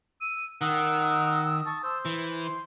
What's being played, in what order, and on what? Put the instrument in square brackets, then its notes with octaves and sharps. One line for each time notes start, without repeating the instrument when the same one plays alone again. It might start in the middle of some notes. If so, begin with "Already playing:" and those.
[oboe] E6 [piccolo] D#7
[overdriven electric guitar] D#3 [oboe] F#5 [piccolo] D#6 [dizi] E6
[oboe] A5 [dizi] C#6
[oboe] C5 [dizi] E6
[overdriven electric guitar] E3 [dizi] C6